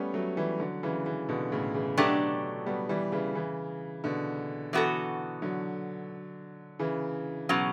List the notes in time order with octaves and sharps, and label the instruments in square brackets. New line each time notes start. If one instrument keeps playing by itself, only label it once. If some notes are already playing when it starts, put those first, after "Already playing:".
Already playing: [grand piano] G3 A3 B3 C#4
F#3 A3
E3 G3
D3 F#3
C#3 E3
C#3 E3
B2 D3
A2 C#3
C#3 E3
[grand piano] B2 D3 [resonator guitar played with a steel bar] F#3 A3 D4 G4
[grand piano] G3 B3
E3 G3
C#3 E3
C#3 E3
B2 D3
[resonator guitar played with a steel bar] E3 B3 F#4 A4
[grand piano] D3 F#3
C#3 E3
[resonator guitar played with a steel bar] B2 F#3 C#4